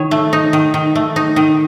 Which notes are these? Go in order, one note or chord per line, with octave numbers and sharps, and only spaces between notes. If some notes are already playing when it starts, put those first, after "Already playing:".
Already playing: D#3 C#5
A3
D#4
D#3
D#3
A3
D#4
D#3